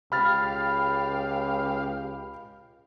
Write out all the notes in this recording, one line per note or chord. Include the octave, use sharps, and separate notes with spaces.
C#2 G4 F5 B5 F6 A6